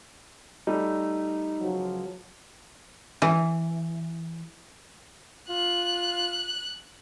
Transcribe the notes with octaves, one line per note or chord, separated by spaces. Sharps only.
G3 A3 D#4
C#2 F3 F#3
E3
F4 F#6